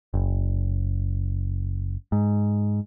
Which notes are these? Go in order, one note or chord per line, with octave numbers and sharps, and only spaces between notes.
F#1
G#2